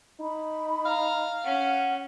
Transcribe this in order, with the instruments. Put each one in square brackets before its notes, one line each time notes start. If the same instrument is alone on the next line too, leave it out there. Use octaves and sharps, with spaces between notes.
[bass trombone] D#4 [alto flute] B5
[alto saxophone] F5 [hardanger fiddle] A#5
[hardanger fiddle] C#4 [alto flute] F#5